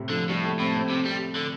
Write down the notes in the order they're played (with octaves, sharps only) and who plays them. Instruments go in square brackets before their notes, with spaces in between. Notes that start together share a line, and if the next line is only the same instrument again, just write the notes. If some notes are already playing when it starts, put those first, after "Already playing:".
Already playing: [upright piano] A2 C3
[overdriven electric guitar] D3 [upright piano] F3
[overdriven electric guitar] A2 [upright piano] G3
[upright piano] A3
[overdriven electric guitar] A2 [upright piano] C4
[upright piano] C4
[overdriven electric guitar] C3
G3
D3